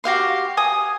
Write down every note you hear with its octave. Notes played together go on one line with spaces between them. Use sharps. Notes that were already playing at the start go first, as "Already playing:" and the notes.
F#4 G4 F5 C6
G#5 D#6